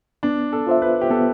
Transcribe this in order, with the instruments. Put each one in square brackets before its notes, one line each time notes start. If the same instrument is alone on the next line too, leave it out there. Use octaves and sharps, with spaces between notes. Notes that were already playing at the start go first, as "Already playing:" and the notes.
[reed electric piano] B3 [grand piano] D4
[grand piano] A4
[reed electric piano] F4 C5 E5
[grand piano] B4
G4
[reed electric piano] B3 [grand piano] A4